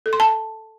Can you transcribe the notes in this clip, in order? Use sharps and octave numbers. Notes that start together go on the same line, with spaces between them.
A4
C6
A5